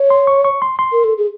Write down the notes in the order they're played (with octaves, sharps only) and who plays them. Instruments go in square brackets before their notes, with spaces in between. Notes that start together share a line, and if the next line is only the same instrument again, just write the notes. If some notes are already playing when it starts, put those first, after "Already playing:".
Already playing: [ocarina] C#5
[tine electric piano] C6
C#6
C#6
C6
C6
[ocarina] A#4
A4
G#4